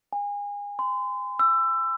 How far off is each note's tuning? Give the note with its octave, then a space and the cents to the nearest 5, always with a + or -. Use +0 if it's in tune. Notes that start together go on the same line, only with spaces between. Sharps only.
G#5 -30
C6 -35
E6 +20